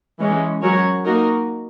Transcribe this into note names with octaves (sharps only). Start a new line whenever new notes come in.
E3 G#3 C#4
F#3 C#4 F#4 A#4 C#5
A#3 D#4 F#4 A#4